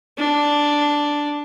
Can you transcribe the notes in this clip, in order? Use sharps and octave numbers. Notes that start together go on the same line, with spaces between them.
D4